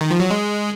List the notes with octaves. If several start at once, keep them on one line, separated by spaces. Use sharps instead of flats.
D#3
F3
F#3
G#3